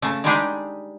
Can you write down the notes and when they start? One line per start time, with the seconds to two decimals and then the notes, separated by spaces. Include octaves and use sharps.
0.02 C#3 A3 A5
0.24 G3 G#3 D4 D#4 G4 G#4